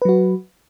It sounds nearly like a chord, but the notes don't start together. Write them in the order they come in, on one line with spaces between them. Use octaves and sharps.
B4 F#3 F#4